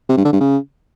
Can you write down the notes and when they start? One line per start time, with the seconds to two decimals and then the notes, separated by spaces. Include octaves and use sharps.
0.09 C3
0.17 G2
0.25 D3
0.33 G2
0.41 C#3